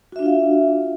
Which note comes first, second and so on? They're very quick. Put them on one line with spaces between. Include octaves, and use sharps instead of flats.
F#4 E5 D4 F4 F5